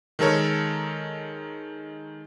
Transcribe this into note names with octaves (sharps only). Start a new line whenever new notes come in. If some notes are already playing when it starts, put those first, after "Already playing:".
D#3 G#3 A4 A#4 C#5